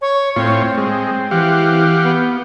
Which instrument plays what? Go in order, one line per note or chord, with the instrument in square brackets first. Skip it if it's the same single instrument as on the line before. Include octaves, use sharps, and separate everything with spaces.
[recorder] C#5
[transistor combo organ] A2 F4 C#5 [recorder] C4
[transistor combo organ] G#3
[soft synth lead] E3 [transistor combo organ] G4 F5 F#5
[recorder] B3 [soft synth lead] G6